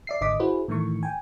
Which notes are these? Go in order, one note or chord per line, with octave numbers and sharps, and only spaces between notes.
D5 E5 C7
G#1 D3 D#5 D6 B6
E4 F#4 G#4 B4 C5
A2 D#3 E3 A3 C#6
G5 G#5